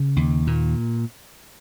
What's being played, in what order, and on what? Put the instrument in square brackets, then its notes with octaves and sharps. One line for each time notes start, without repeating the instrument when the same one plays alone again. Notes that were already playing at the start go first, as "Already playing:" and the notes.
Already playing: [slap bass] C#3
D#2
A#2